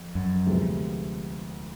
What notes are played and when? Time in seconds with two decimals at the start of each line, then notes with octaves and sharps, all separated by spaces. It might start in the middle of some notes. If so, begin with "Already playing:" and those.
Already playing: F2
0.15 F#2
0.46 D2 C3 F3 G#3 B3